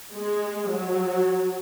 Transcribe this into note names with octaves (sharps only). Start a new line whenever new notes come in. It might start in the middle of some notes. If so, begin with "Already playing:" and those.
G#3
F#3